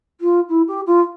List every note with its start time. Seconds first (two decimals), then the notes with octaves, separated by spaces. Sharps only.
0.21 F4
0.49 E4
0.68 G4
0.87 F4